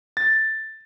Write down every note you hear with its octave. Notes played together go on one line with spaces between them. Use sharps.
A6